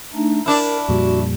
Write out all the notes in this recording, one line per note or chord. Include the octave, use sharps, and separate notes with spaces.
A3 D4 D#4
D4 E4 A#4
F2 A#2 G3 F#4